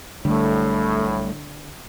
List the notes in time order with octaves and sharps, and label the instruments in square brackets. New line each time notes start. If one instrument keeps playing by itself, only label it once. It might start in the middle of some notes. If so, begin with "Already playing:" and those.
[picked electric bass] B1 G3 [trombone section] A2 [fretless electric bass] D3 [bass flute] A3